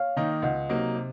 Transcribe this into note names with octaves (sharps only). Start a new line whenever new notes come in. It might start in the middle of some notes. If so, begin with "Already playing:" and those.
Already playing: C#5 F5
D#3 A#3 D#4
C#2 D#5 F#5
C3 F#3 A#3 D#4
C3